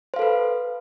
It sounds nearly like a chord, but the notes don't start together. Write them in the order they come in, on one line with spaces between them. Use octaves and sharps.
C5 F5 A4 B4